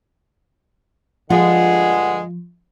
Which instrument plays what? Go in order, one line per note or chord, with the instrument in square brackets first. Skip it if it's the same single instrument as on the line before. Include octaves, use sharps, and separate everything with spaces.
[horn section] G2 D3 G#3 [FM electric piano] F3 [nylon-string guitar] F4 [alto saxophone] F#5